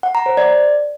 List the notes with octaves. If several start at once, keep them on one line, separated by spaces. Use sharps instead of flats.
F#5
A#5
C5
D5